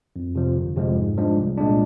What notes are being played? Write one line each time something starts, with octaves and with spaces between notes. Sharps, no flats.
F2
C3 F3
G1
F2 C3 F3 G#3
G#2
F3 G#3 D4
C2
A#2 G#3 D4